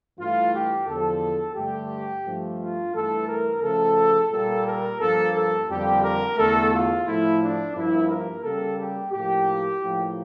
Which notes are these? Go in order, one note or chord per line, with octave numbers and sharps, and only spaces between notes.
G2 E3 A3 F4
G4
E2 D3 F3 A4
G2 D3 A3 G4
G2 F3 A3
F4
G2 E3 A3 A4
A#4
C#3 F3 A3 A4
A#2 G3 A#3 A4
A#4
G2 F3 A#3 A4
A4
F2 D3 G3 A#3 G4
A#4
E2 D3 A3 A4
F4
A2 F3 A3 E4
D4
G2 F3 A#3 E4
A#4
C#3 G3 A#3 A4
G4
A2 F3 A#3 G4
A2 F3 A#3